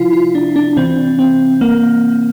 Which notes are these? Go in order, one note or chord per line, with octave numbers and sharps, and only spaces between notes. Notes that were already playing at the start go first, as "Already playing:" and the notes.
Already playing: C3 F3 E4 F4
F4
D4
D4
C3 E3 C4
C4
A#3